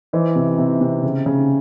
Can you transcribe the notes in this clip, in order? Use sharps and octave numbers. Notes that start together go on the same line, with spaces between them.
E3 C5 D#5
C3
C3
C3
C#3
C#3